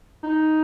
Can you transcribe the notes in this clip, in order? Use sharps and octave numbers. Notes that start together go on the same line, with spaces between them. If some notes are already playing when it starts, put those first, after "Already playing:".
D#4